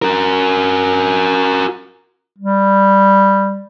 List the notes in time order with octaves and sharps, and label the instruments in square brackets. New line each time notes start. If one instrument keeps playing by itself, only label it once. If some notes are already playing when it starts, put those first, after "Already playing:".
[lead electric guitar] F#4 A#4
[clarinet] G3